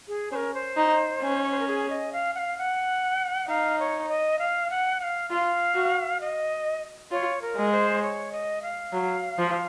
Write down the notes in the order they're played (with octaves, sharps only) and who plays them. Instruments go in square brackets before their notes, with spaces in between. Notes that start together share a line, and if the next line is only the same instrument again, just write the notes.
[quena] G#4
[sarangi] C#4 [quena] C5
[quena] A#4
C5
[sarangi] D#4
C#4
[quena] C#5
C5
A#4
G#4
D#5
F5
F#5
F5
F#5
[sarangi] D#4 [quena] F5
[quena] C#5
D#5
F5
F#5
F#5
F5
[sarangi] F4 [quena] F5
[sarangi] F#4
[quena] D#5
[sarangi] F4 [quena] C#5
[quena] A#4
[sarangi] G#3
[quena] C5
C#5
D#5
F5
[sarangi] F#3
F3